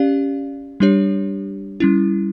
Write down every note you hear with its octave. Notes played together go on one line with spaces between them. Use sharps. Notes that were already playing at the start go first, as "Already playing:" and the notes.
Already playing: C#4 G4 D5 F5
G3 D4 G4 C#5
G3 C#4 E4